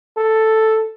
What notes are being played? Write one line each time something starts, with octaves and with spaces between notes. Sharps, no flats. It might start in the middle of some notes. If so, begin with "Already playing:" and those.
A4